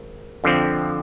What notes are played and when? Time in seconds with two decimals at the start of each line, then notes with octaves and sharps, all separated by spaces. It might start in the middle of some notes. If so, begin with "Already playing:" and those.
Already playing: G#1
0.44 F2 D3 F3 C4